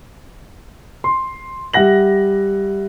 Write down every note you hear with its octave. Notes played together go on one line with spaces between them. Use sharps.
C6
G3 E5 F#5 A#6 F#7